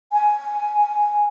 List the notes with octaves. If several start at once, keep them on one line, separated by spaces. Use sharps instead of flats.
G#5